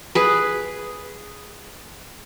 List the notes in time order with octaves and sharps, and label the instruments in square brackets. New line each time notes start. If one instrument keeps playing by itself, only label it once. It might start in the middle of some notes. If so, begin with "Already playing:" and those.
[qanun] G#4 B4